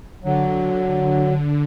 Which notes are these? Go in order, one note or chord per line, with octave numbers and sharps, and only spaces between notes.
D3 F#3